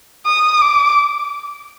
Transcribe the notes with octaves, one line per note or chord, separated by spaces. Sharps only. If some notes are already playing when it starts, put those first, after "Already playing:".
D#6
D6